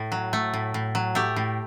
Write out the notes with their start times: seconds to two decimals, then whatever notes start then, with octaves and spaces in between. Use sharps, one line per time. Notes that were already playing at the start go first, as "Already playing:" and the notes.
Already playing: A2
0.12 F#3
0.33 A3
0.54 A2
0.74 A2
0.95 F#3
1.15 A3 G4
1.36 A2